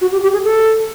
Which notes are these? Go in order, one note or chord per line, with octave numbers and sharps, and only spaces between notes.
F#4
G4
G4
G#4
A4